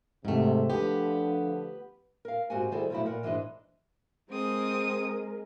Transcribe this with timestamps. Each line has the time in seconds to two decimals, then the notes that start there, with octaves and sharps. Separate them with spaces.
0.25 G#2 C3 A3
0.70 D3 F3 B3 G4
2.25 A#4 F5
2.50 G#2 C4 F#4 G4 F#5 G#5
2.72 D#3 G3 E4 G#4 A4 C5
2.90 B2 F3 F#3 A3 E4
3.06 A#2 A#4 F#5
3.23 G#2 E3 G#3 D4 D#5
4.30 G#3 C4 A#4 D#6